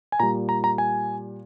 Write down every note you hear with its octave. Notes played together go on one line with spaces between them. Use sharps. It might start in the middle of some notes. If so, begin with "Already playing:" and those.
G#5
A#2 G3 A#5
A#5
A#5
G#5